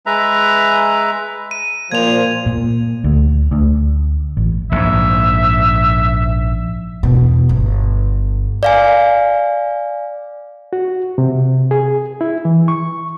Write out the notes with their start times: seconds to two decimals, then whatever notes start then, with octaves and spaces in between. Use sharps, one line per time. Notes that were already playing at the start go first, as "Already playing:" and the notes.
0.06 G#3 B4 E5 A#5
1.51 D#7
1.92 A#2 F3 C5 G#6 F7
2.46 A#2
3.04 D2
3.51 D2
4.37 A1
4.72 A#1 G#2 E5
7.03 E2 B2
7.49 G1
8.63 D5 F5 G#5
10.73 F#4
11.18 C3
11.71 G#4
12.21 E4
12.45 E3
12.68 C#6